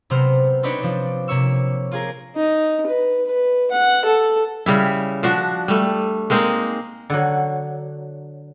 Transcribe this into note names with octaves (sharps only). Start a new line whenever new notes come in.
C3 F#3 B3 C5 F6
C4 D4 D#4 B4 C#5 D5
F3 D4
C3 A#3 C#5 C#6 E6
F4 G#4 A#4
D#4
B4
B4
F#5
A4
C#3 G3 E4
F3 D4 F#4
G3 A3
G#3 A#3 C4 D#4
D3 F#3